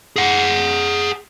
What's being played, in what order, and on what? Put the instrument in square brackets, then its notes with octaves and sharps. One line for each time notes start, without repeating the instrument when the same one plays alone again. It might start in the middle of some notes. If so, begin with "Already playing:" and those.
[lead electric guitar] G#4 F#5